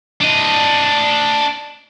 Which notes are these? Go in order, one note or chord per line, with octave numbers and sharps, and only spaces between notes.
D4 D#5